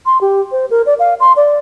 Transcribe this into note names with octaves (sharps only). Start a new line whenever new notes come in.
C6
G4
C5
A#4
D5
F5
C6
D5